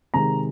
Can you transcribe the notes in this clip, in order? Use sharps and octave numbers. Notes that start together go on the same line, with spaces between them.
C3 D#3 G#3 A#5